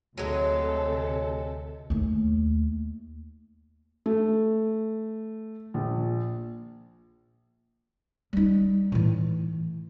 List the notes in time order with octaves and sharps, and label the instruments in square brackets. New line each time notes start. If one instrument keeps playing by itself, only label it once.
[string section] D2 C3 A4 [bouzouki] F#3 G#3
[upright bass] D#2 A3
[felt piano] A3
A#1
[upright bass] G3 D#4
A2 E3